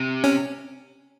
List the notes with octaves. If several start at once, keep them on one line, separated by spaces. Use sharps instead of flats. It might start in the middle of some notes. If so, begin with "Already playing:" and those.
Already playing: C3
C#4